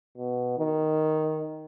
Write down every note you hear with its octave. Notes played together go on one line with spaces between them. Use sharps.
B2
D#3